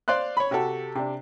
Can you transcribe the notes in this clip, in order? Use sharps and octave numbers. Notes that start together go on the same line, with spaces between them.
C5 D5 F5 C6 F#6
C#5 B5
C3 F#4 G4 A4
C3 D4